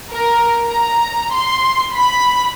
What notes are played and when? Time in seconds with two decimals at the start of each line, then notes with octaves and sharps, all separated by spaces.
0.11 A#4
0.68 A#5
1.33 C6
1.94 B5